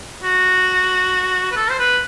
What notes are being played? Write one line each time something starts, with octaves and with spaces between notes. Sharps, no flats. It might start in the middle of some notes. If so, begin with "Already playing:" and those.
F#4
B4
A4
C5
B4